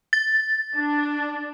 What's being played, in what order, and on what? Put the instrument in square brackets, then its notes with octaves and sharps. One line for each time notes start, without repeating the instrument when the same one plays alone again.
[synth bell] A6
[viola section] D4